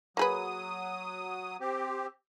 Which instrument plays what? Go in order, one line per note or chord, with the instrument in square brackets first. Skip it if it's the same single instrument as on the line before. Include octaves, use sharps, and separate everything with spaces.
[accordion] F#3 D#6 [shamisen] A#3 G#4 B4
[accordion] C4 G4